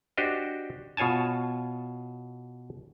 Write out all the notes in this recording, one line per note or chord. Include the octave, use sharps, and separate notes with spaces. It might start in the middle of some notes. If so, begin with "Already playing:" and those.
D4 F#4 G4 C5 D#5
B2 F4 C#5 G#5 A5